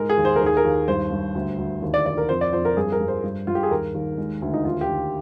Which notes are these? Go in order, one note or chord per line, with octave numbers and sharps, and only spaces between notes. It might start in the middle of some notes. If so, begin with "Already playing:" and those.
Already playing: G#2 G#3 A#4
G#4
D#2
C5
A#4
D#2
G#4
A#4
D#2
G2 C5
G2
D2
D2
D#2
D5
D#2 D5
A#4
F2 C5
D5
F2 C5
A#4
G2 G#4
A#4
G2
C5
G2
G2 F4
G4
G#4
D#2 A#4
D#2
G#3
D2
D#4
D#2 F4
G4
D#2